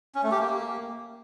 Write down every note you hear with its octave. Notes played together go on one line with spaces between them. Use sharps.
C#4
A3
G4
A#3